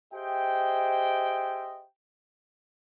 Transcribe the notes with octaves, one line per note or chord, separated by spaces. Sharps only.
G4 G#4 C5 D#5 E5 G5